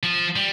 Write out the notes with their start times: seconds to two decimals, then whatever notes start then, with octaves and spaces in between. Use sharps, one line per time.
0.03 F3
0.36 G3